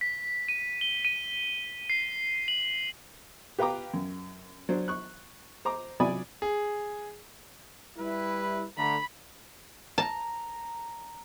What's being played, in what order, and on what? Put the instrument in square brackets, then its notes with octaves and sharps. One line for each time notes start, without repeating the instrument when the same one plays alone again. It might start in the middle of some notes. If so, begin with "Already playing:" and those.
[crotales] B6
D#7
G7
D#7
C7
F#7
[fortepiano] G4 B4 F5 G5 A#5 D6
F#2
F#3 D4 C5
C#6 F#6
C5 A#5 D6
C3 F#3 D5 G#5 B5 D#6
[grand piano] G#4
[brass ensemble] G3 E4 B4
[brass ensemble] D3 A3 A#5 [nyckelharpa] B5
[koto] A5 [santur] A#5